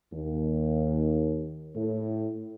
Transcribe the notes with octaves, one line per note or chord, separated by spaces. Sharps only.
D#2
A2